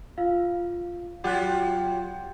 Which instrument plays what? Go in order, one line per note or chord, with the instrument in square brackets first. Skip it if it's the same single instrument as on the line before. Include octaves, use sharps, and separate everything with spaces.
[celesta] F4 F5
[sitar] F#3 F4 G4 [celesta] F#5 G5 F#6